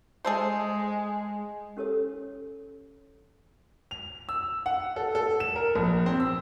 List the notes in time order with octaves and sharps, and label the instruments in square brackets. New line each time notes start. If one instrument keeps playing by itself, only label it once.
[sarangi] G#3 [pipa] G#4 A4 C5
[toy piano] C#4 G4 A4 C#5 D#6
[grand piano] F7
E6
F#5
A4
A4
E7
A#4
A#1
C4
E6